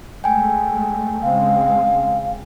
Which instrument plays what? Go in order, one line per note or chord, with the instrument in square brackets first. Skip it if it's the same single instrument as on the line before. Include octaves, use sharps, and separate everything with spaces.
[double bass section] G#3 A3 [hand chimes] G5 G#5
[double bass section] C#3 G#3 C4 [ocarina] F5